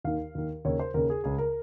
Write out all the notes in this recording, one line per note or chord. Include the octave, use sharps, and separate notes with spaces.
D#2 D#3 F5
D#2 D#3
D#2 C#3 C#5
C5
D#2 C#3 A#4
G#4
C#2 C#3 G#4
A#4